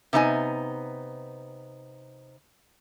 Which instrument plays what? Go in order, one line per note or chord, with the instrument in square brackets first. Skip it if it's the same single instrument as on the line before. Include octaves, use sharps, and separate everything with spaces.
[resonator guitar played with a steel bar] C3 B3 D#4 G#5